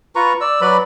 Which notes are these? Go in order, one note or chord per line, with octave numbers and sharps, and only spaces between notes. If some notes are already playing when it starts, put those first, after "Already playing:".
F4 B4 A#5 C#6
D5 E6
F#3 B4 D5 B5